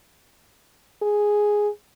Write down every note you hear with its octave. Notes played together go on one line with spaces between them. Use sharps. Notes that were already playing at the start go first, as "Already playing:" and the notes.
G#4